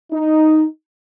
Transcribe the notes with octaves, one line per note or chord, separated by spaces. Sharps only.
D#4